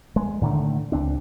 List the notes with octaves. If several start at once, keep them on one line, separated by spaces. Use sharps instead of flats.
G#3
A2 D3 D#3 A3
C#2 C4 D4